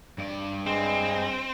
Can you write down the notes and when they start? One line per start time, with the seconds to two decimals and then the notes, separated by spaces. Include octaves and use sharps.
0.18 G2 D5
0.67 G#3 C4